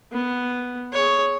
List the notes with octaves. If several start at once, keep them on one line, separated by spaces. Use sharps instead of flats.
B3
G#4 C#5